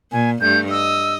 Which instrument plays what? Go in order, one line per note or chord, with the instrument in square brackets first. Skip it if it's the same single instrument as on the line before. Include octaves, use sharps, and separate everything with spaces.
[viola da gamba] A#2 [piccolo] G#5
[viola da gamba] G2 A3 [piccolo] G6
[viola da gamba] D#5 [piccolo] E6